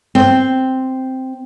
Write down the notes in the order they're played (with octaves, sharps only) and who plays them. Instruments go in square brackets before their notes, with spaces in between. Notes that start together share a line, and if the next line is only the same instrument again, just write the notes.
[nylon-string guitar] C4